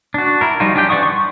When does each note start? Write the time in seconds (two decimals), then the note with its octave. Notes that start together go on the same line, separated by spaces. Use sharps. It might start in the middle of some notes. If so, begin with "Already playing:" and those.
0.14 D4 F#4
0.41 E4 A#4
0.60 F3 G3 D#4 F4 F#4
0.74 C#4 D4 G4 G5
0.89 E3 D5 F#5 C#6 D#6
1.03 C6 C#6